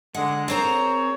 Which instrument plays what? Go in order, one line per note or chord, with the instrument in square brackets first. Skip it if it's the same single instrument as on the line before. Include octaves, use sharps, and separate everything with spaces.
[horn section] D3 G#3 [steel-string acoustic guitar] F#5
[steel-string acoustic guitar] C4 C5 A#5 [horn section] G#4 A#4 C#5